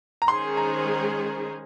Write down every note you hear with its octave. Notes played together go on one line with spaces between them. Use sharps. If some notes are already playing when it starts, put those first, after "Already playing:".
A#5
D#3 G#3 C#4 G#4 C5 C6
A#5